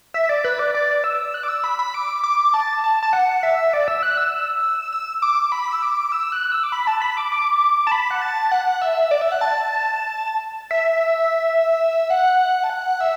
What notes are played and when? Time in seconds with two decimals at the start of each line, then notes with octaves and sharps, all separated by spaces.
0.14 E5
0.29 D5
0.44 B4
0.59 D5
0.74 D5
1.04 E6
1.34 F#6
1.43 D6
1.49 E6
1.64 B5
1.79 B5
1.94 D6
2.24 D6
2.54 A5
2.84 A5
3.03 A5
3.13 F#5
3.43 E5
3.73 D5
3.88 E6
4.03 F#6
4.17 E6
4.93 E6
5.22 D6
5.52 B5
5.72 E6
5.82 D6
6.12 E6
6.32 F#6
6.52 E6
6.63 D6
6.72 B5
6.87 A5
7.02 B5
7.17 D6
7.32 D6
7.87 A5
7.92 B5
8.11 F#5
8.22 A5
8.52 F#5
8.82 E5
9.11 D5
9.22 E5
9.32 F#5
9.41 A5
10.71 E5
12.10 F#5
12.64 A5
12.70 F#5
13.00 E5